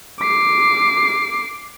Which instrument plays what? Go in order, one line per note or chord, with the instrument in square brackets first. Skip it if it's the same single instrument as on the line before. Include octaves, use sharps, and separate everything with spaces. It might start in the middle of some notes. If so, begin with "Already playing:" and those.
[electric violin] D6 C7